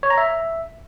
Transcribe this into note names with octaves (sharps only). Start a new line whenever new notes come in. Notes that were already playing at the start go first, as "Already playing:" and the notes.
C#5
A#5
E5